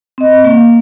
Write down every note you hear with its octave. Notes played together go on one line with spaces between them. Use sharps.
C4 D#5
A#3